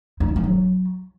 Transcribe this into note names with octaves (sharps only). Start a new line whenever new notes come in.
D#4
E4
D#4
F#3